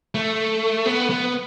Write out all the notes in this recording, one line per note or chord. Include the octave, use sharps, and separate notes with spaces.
A3
B3
B3